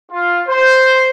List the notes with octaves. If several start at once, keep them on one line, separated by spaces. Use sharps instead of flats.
F4
C5